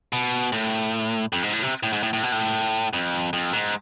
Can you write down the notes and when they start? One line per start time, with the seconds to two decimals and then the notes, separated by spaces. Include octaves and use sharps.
0.13 B2
0.52 A2
1.33 F2
1.43 G#2
1.53 A2
1.63 C3
1.83 A2
1.93 G#2
2.03 A2
2.13 A2
2.23 B2
2.32 A2
2.93 F2
3.33 F2
3.53 G#2